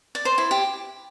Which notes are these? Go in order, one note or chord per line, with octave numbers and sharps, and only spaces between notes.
D5
C5
E4
G4